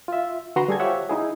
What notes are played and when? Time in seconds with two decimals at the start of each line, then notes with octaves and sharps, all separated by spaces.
0.08 F4 E5
0.56 D3 F#4 B4 A#5 C6
0.68 G3 G#4 A4 G#6
0.80 F4 G4 C5 C#5 E5 F#5
1.09 D#4 E4 G#4